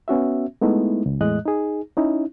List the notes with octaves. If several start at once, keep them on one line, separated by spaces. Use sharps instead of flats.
B3 C#4 F#4 E5
G#3 A3 B3 D#4 E4
C#2
E2 A2 G#3 D#5 F#6
D#4 G#4
C#4 D#4 E4